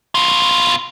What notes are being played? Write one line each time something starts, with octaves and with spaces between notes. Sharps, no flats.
B2 F4